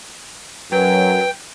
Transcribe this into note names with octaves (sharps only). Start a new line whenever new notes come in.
F#2 F#3 B4 G5